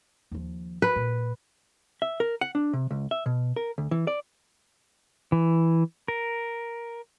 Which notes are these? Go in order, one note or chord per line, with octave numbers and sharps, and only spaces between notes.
D#2 F3
B4
A#2
E5
A#4
F#5
D4
C3
C#2
E5
B2
A#4
D2
E3
D5
E3
A#4